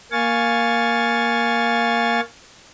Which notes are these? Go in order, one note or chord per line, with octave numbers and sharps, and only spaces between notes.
A#3 F5 G#5 C#6 A6